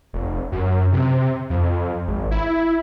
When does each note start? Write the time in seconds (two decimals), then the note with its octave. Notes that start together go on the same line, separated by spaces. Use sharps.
0.13 F1
0.52 F#2
0.92 C3
1.50 F2
2.07 G#1
2.31 E4